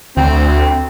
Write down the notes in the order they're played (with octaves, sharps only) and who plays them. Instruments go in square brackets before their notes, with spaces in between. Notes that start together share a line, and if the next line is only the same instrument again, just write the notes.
[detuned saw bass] D2 [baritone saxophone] C4